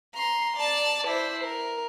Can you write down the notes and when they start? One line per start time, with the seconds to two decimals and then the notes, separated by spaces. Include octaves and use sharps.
0.15 A#5 C6
0.57 D5 A5
1.07 E4 C5
1.44 A#4